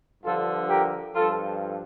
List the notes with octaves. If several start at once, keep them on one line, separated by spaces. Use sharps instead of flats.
G2 D3 F3 F4 A4
G4 A#4
G2 F3 F4 A4